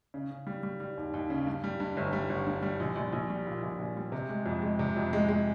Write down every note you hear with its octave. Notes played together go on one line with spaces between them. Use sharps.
C#3
C#3
G3
G3
G3
D#2
D#2
C#3
G2
G3
G2
G1
G3
G1
G2
G3
A#1
A#1
A#1
G3
A#2
A#1
A#1
G3
C3
G#3
F2
G#3
C3
F2
G#3
G#3